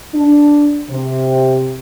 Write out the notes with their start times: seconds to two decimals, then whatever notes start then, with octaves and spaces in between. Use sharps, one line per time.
0.14 D4
0.89 C3